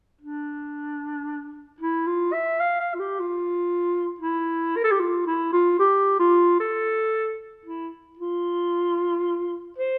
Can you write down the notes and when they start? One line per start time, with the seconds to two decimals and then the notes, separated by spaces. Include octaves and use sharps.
0.21 D4
1.80 E4
2.07 F4
2.33 E5
2.60 F5
2.80 F5
2.94 F4
3.00 G4
3.19 F4
4.20 E4
4.76 A#4
4.84 A4
4.91 G4
4.99 F4
5.27 E4
5.53 F4
5.79 G4
6.19 F4
6.60 A4
7.65 E4
8.19 F4
9.78 C5